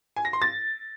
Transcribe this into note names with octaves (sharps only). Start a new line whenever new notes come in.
G#5
A#6
C6
A6